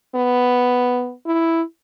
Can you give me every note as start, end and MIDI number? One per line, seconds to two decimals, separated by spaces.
0.15 1.13 59
1.26 1.62 64